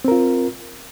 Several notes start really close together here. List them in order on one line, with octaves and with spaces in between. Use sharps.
C4 A#4 F4